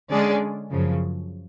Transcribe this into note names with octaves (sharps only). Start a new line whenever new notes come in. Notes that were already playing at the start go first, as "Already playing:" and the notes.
D3 G#3 C#4 G#4 D5
F#2 C#3 F3